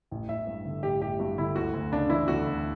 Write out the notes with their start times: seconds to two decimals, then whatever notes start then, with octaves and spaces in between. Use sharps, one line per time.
0.11 A1
0.29 A1 E5
0.47 G2
0.65 D3
0.83 A1 G4
1.01 A1 G4
1.19 G2 F#4
1.38 D3 E4
1.56 D2 F#4
1.73 D2
1.92 C#3 D4
2.10 E3 E4
2.28 D2 F#4
2.47 D2